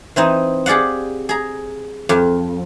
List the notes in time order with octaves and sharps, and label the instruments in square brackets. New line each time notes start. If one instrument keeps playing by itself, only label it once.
[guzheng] E3 C4 D#4
G4 G#4 D5 F5 F#5
G#4 A#5
F2